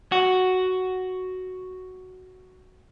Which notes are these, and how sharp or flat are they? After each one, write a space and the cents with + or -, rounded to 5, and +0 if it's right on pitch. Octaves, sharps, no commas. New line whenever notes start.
F#4 +5